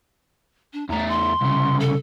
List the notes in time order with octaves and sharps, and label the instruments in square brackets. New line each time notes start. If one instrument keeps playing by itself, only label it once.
[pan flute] D4
[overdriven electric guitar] E2 A3 [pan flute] A#5
[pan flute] C6
[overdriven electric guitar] C2 C#3
[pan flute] A4